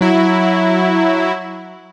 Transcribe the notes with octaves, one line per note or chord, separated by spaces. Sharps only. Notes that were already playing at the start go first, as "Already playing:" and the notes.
F#3 E4